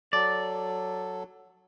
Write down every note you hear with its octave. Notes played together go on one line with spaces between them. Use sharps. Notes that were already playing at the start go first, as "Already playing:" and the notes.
F#3 A4 D5